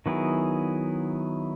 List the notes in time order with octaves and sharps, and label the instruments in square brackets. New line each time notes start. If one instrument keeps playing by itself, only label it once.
[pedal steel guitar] D#3 F#3 B3 E4 G#4